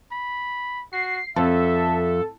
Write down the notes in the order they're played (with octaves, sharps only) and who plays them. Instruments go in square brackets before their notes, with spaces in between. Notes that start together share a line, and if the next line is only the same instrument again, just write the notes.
[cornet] B5
[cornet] F#4 [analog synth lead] C7
[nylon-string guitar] F2 [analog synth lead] A4 [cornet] E5